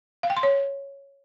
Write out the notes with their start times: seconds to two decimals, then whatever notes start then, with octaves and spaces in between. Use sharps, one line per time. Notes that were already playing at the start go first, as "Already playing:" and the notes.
0.23 F5
0.30 G5
0.37 C6
0.43 C#5